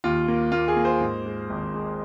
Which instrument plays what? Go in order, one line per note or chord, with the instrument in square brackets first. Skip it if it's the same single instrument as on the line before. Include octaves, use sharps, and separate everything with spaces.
[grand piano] D#2 F4
A#3
A#3 F4
G#4
A#3
C5
G#2
G#3
G#1
G#3